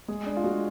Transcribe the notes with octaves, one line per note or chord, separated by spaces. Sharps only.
G#3 G#4
D4
F4
G#3 F#4